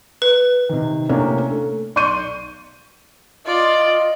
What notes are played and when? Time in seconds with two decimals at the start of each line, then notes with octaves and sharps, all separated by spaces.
0.22 B4
0.69 C3 D#3
1.09 A2 C3 A#3 C#4 D4
1.50 A3
1.96 B1 D5 C6 C#6 G6 D#7
3.46 F4 D5 D#5